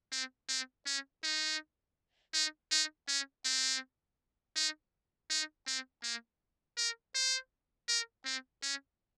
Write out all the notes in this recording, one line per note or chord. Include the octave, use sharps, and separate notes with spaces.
C4
C4
C#4
D#4
D#4
D#4
C#4
C4
D#4
D#4
C4
A#3
A#4
C5
A#4
C4
C#4